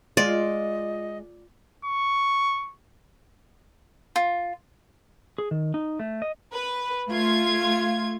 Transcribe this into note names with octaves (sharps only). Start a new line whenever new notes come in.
G#3 F4 D5 D#5
C#6
F4
G#4
D#3
D#4
A3
D#5
B4
A3 F4 G#6